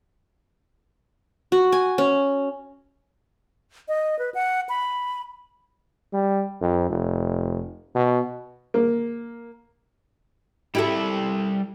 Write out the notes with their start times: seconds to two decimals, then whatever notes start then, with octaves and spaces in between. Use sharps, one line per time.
1.52 F#4
1.72 G#5
1.98 C#4
3.88 D#5
4.19 B4
4.34 F#5
4.69 B5
6.14 G3
6.61 F2
6.90 F1
7.95 B2
8.74 A#3
10.75 G3 E4 G4 A4 E5